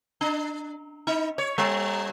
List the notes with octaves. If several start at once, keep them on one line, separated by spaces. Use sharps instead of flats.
D4
D#4
C#5
G3